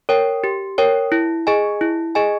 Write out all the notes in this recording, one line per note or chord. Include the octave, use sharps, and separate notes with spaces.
A#4 C#5 G5
G4
A#4 C#5 G5
E4
G#4 D#5 G#5
E4
G#4 D#5 G#5